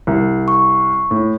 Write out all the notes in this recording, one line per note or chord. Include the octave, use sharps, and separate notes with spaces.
C2
C#6
A2